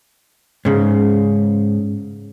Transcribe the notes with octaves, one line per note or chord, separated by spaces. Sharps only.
G#2 C#3